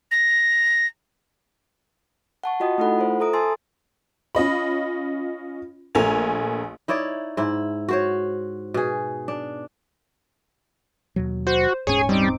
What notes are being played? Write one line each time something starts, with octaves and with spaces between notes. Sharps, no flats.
A#6
F#5 A5 C#6
F4 F#4 D#5 G5 D#6
A3 D#4 E4 A4 F#5 B5
F4 C5
A4 E5 A#5 D#6 D7
G#5 A5 C6 E6 A6
C#4 F4 D#5 B5
A#1 A3 A#4 G#5 F7
D#4 E4 C#5 D5
G#2 E4
F#4 C5 C#5
B2 G#4
D4
D#2 B2 F#3
F#4 C5
D#1 G#2 C#4 G#4 C#5 G#5
G3 C4 D#4 D6